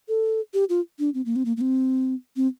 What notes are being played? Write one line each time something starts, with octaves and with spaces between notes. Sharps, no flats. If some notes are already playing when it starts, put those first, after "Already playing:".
A4
G4
F4
D4
C4
A#3
C4
A#3
A#3
C4
C4